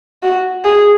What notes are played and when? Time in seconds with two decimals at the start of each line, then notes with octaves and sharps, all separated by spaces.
0.23 F#4
0.65 G#4